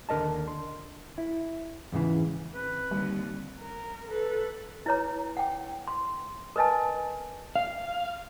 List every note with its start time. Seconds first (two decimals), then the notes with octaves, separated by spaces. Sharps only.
0.09 D#2 D3 A#4 D#5 A5
0.48 C6
1.18 E4
1.92 E2 G#2 C#3 E3
2.55 C4 B4
2.91 D#2 D3 G3
3.60 A#4
4.08 A4 B4
4.86 E4 B4 C#5 A#5
5.37 F#5 G5
5.88 C6
6.56 A#4 B4 D#5 G#5 A5
7.56 F5